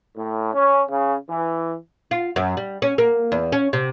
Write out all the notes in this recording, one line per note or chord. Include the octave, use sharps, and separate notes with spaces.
A2
C#4
C#3
E3
F4
F#2
G3
C#4
A#3
E2
C#4
C3